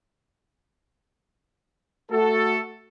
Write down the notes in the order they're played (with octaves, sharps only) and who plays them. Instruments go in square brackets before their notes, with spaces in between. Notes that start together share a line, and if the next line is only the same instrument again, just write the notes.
[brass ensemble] A3 F#4 A4